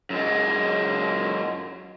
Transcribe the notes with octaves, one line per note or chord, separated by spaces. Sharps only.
F#2 G#3